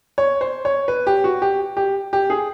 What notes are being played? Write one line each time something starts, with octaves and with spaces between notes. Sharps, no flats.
C#5
C5
C#5
B4
G4
F#4
G4
G4
G4
G#4